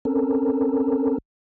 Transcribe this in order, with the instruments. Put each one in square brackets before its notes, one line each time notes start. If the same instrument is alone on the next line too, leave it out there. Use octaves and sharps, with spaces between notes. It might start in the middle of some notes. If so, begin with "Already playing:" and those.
[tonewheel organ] C4 C#4 A4 A#4